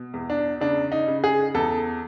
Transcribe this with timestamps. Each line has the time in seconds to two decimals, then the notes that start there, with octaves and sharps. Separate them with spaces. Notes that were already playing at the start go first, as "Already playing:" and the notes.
Already playing: B2
0.14 E2
0.30 D4
0.61 C#3 D4
0.92 D#4
1.08 C#3
1.24 G#4
1.54 E2 A4